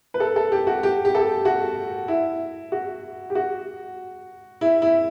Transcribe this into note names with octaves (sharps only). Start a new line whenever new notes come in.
B4
A4
A4
G4
F#4
G4
G4
A4
F#4
E4
F#4
G4
F#4
E4
E4